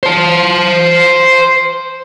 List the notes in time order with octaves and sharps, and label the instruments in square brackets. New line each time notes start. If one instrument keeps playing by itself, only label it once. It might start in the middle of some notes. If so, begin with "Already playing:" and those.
[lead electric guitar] C5 A5